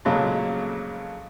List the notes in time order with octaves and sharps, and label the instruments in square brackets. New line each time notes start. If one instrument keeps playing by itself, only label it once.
[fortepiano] F2 A#2 C#3 F#3 G#3 A3